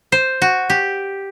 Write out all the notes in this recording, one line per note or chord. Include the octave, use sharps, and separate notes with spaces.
C5
F#4
G4